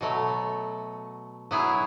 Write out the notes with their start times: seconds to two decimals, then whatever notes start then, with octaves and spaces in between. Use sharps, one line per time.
0.01 B2 F#3 A3
1.51 F#3 B3 E4 G#4